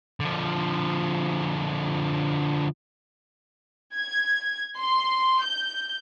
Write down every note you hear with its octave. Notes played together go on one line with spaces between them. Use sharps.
D3 F3
G#6
C6
G6